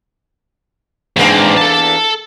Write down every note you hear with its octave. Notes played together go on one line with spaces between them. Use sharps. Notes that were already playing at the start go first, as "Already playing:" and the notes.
E2 G#2 A#3 C4 D4
A4 A5